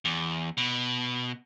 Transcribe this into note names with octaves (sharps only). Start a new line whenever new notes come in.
E2
B2